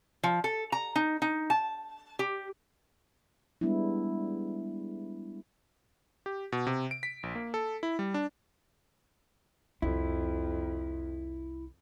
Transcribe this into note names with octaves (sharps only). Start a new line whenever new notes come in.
F3
A4
A#5
D#4
D#4
A5
G4
G3 G#3 B3 D4 E4
G4
B2
C3
D7
B6
A#1
A#3
A4
E4
G3
D4
C2 F2 E4